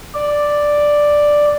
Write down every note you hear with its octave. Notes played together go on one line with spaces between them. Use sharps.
D5